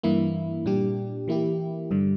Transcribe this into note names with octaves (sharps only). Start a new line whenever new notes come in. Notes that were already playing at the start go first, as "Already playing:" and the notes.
G2 E3 A#3 E4
A#2 G3 D4 G4
E3 A#3 E4 G4
G2 D3 G3